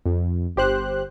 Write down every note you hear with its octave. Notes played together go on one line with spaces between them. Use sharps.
F2
G1 G4 C5 F#6